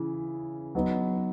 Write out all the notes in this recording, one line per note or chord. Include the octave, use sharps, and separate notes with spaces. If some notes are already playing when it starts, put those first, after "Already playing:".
Already playing: C#3 E3
F#3 B3 D#4